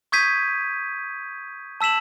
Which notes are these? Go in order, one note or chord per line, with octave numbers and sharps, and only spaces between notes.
C#6 D#6 G6 G#6 B6 D#7
A5 E6 B6 E7 F#7